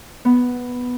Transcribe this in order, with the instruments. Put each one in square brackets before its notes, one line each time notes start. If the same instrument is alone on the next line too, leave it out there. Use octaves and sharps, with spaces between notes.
[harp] B3